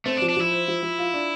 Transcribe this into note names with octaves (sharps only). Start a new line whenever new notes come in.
A3 C4
D4
F3
D4
F3 E4
C5
F3
F3
F4
D4